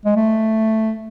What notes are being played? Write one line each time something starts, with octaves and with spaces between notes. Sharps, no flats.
G#3
A3